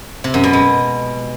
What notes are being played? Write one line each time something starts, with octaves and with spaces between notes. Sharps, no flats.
C3
F#2
B2
G#3